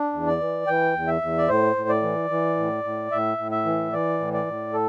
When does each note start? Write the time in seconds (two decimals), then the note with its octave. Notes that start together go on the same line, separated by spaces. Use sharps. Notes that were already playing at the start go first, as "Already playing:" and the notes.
Already playing: D4
0.13 E2
0.27 D5
0.40 E3
0.67 E3 G5
0.94 E2
1.07 E5
1.22 E2
1.38 D5
1.48 A2 C5
1.76 A2
1.89 D5
2.02 E3
2.30 E3
2.57 A2
2.84 A2
3.12 A2 E5
3.38 A2
3.52 E5
3.65 E3
3.92 E3 D5
4.20 A2
4.33 D5
4.47 A2
4.74 A4